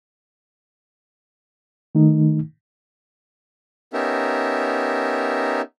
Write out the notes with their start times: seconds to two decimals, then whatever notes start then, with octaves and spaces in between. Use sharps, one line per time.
1.95 D#3 A3 D#4
3.93 B3 C#4 D#4 G4 A#4 E5